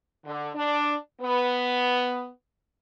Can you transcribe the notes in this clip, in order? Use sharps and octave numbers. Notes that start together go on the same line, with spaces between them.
D3
D4
B3